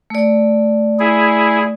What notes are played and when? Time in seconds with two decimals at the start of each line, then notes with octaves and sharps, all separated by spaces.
0.10 A3 D5
0.99 E4 G#4